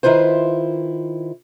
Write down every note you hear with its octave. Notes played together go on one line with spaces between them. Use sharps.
D#3 E4 F4 B4 C5